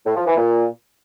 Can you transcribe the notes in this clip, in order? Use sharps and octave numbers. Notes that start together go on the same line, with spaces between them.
A2
F3
E3
A#2